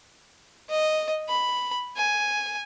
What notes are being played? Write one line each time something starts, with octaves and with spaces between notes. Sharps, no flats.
D#5
B5
G#5